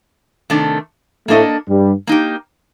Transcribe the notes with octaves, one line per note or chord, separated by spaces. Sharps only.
C3 D#3 A3 D4
A2 A3 A#3 D4 A4 D#5
G2 G3
A#3 D#4 G4